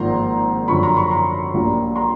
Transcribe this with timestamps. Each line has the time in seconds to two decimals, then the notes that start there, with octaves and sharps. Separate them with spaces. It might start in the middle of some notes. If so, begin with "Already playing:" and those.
Already playing: G#1 G#2 F3 A#3 A#5 C6
0.68 F#2 D3 F3 B5 C#6
0.83 A#5 C6
0.97 B5 C#6
1.11 A#5 C6
1.54 A#1 A#2 G3
1.96 A#5 C6